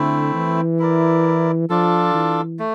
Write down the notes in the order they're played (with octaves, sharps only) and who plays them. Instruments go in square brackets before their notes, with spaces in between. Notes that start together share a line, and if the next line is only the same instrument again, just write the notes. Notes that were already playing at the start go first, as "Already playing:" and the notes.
Already playing: [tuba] D3 [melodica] A3 C4 E4
[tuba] E3
[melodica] E4 A#4 D5
[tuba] F3 [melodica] D4 F4 A4
[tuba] E3
[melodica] A3